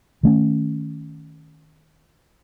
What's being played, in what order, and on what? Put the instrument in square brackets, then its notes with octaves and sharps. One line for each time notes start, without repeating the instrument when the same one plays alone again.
[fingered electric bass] D#3 A3 C#4